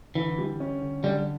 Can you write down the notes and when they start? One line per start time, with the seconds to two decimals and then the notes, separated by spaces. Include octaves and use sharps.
0.15 D3 E3
0.38 G3
0.60 C#4
0.82 D3
1.03 D3 G3